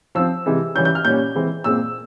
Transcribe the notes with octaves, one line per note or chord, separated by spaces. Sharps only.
F3 C4 E6
C3 E3 G#3
E3 G3 C#4 G6
G6
F6
A#2 G3 C#4 G6
E3 G#3 C4
A#2 G#3 C4 E6